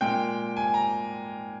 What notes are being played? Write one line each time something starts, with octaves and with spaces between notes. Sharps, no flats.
A#2 G#3 G5
G#5
A#5